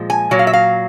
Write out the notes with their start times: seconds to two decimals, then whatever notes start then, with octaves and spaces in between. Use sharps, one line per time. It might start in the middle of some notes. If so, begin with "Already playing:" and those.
Already playing: A#2 F3 G#3
0.10 G#5
0.31 A#2 F#3
0.39 F5
0.47 E5
0.53 F5